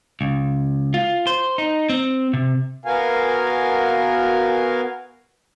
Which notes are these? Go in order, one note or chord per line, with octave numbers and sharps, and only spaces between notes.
C#2
F4
C5
D#4
C4
C3
B3 F#4 A#4 F5 G#5